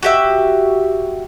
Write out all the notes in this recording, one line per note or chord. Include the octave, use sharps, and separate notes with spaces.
F#4 G4 E5